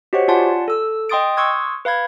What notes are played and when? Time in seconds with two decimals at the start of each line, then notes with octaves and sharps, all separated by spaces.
0.13 F#4 G4 C5 C#5 D#5 F#5
0.28 F4 D5 F#5 G#5 A5 C6
0.68 A4 E6
1.09 D#5 G5 C6 D#6 A6 D7
1.37 C6 C#6 D#6 E6 F#6 G#6
1.85 B4 F5 B5 G#6